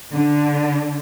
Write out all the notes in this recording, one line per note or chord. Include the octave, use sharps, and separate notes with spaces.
D3